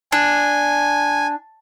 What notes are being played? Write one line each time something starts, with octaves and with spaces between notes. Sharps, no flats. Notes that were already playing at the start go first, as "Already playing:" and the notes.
D4 G#5